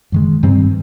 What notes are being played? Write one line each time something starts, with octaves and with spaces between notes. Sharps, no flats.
F#2 D#3 G#3
G2 D#3 G3 C4